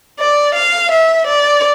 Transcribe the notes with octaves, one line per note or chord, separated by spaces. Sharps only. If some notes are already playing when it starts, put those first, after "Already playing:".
D5
F5
E5
D5